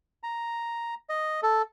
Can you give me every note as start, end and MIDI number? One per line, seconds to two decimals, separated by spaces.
0.23 0.95 82
1.09 1.41 75
1.43 1.62 69